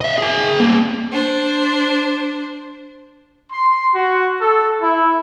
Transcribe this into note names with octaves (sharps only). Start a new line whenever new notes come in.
D#5 E5
G#4 G5
G3 A#3
D4 C5
C6
F#4
A4
E4